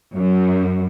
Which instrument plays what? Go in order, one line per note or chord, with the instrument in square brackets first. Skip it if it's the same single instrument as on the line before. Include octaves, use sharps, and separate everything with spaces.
[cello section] F#2